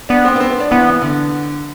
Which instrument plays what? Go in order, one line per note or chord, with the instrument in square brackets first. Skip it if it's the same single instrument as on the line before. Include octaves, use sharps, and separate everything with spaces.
[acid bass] B3 [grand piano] D4
[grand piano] C4
B3
C4
B3
D4
[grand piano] E3 [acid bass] B3
[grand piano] D3